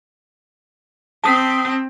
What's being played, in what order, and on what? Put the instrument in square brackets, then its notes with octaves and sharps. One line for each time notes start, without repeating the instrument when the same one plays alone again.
[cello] C4 [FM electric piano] A5 D#6 B6